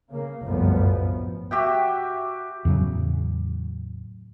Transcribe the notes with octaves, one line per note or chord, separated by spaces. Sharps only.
C#3 A#3
G1 C2 F#2 A2 F3 B3
F#4 G4 E5 G5
E2 A2 C#3 F#3